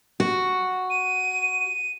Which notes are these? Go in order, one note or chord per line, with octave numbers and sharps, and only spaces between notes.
F#4
D#7